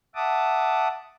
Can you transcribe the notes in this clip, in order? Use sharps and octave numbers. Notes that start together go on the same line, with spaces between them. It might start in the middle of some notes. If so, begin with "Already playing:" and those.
E5 F#5 A5 D6 D#6